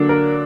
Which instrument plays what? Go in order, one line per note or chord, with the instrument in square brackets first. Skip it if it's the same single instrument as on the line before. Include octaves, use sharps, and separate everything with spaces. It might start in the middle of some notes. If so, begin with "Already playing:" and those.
Already playing: [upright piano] D3 F#3 A#3 D4
A#4